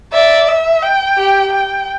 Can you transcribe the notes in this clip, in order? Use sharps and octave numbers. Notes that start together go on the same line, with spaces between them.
D5 E5
E5
G5
G4
G5